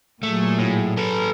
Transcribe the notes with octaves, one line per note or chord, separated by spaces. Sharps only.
A#2 F#3 A3 G#4
A2
A4 B4